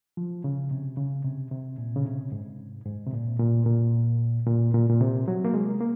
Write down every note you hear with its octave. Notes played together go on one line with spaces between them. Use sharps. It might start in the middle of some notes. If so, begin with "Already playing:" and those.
F3
C#3
C3
C#3
C3
C3
A#2
C#3
C3
G#2
G#2
C3
A#2
A#2
A#2
A#2
A#2
A#2
C3
F#3
A#3
G#3
A#3